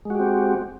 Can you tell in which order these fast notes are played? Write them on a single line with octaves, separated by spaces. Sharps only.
G#3 F#4 G4 C4